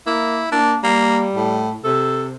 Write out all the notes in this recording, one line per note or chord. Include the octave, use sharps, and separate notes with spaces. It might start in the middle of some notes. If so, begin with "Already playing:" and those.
A#3 E4
A#3 D4
G3 A#3
A2
C3 A4